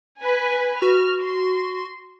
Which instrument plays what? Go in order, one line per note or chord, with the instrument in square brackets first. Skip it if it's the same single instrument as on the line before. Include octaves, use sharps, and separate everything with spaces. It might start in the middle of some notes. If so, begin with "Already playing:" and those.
[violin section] B4 G#5
[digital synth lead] F#4 [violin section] F6
[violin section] C6